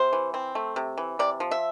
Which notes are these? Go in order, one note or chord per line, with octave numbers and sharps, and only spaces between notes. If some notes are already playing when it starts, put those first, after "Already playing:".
Already playing: C3 C5
E3
C4
A3
C3
E3
C3 D5
F3
E5